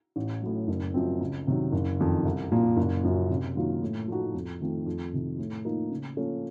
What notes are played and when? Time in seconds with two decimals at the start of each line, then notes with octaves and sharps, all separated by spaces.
0.16 A1
0.42 A2 F#3
0.68 F#1
0.94 F#2 F3 C4
1.21 C#2
1.47 C3 D#3 F#3
1.72 F#1
2.00 F2 D#3
2.25 C2
2.51 A#2 F3 A#3
2.77 F#1
3.03 F#2 F3
3.30 C3
3.55 D#3 F#3 A#3 F4
3.82 A2
4.07 F3 A3 D#4 F#4
4.35 F2
4.61 D#3 A3 C4 F4
4.86 F2
5.13 C3 D#3
5.38 A2
5.65 F3 A#3 D#4 A#4
5.91 C#3
6.17 F3 A#3 C#4 A4